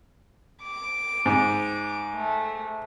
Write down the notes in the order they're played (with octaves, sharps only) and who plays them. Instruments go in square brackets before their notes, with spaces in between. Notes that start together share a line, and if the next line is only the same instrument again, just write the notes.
[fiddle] D6
[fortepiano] G#2
[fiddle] A3